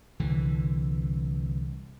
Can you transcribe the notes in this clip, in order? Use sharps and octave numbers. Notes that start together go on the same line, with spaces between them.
C2 D3 E3